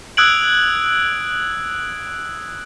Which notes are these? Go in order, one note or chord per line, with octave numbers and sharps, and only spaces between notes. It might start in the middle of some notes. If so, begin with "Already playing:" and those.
D#6 E6 F#6 G#6 D7 F#7